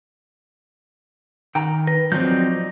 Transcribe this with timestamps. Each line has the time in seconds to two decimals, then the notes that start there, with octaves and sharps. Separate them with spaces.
1.55 D#3 G5 A#5
1.87 B4 A#6
2.12 F3 F#3 C4 D#4 D5 G6